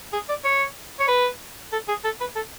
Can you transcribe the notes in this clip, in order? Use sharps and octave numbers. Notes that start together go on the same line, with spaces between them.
G#4
D5
C#5
C#5
B4
A4
G#4
A4
B4
A4